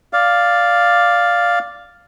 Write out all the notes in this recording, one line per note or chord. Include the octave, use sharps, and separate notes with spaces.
D5 F5